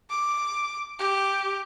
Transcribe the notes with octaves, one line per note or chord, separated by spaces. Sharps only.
D6
G4